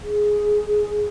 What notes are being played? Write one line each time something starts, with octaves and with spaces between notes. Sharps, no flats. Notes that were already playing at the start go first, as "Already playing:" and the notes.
G#4